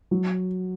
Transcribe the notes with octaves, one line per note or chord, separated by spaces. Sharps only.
F#3